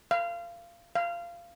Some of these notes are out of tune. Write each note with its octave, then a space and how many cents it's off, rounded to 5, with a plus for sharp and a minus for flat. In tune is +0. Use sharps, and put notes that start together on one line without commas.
F5 -25
F5 -20